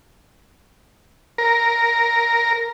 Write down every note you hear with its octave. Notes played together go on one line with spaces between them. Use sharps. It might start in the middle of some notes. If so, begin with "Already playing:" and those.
A#4